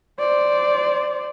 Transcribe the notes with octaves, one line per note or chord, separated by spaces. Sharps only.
C5 D5